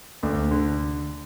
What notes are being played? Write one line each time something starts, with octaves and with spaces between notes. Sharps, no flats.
D2
D3